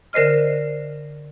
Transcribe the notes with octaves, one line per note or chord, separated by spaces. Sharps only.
D3 A#4 C5 D#5 F6